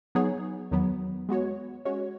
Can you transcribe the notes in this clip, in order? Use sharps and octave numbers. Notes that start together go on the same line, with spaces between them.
F#3 B3 D#4 G#4 C#5
E2 D#3 F#3 B3
G#3 B3 F#4 C#5
G#3 C#4 F#4 C#5